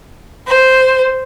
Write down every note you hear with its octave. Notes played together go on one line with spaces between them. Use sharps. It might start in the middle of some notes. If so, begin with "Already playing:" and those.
C5